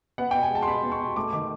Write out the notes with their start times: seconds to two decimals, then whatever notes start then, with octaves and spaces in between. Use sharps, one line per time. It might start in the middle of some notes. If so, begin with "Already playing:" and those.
0.18 B3 F#5
0.31 G5
0.35 B2
0.43 G#5
0.51 G#3 A5
0.62 C6
0.67 B2 B5
0.83 B3
0.92 C#6
1.00 B2
1.16 A3 D6
1.33 D#3 D6